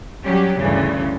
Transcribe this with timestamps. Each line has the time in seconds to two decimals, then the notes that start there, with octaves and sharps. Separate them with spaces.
0.23 F#3 G3 C#4 G4
0.58 D2 G2 C#3 E3